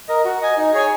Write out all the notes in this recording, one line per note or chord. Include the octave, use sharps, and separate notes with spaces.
A#4 D#5
F#4
D#5 G#5
D#4
G#4 C#5 G#5